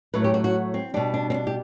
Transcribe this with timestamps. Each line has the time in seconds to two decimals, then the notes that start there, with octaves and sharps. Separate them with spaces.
0.14 A2 F#3 A3 B4
0.24 G4
0.34 F#4
0.44 F#4
0.74 C4
0.94 B2 G3 D4
1.14 D4
1.30 C4
1.34 D4
1.47 G4